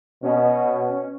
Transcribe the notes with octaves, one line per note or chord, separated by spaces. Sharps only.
B2 C#4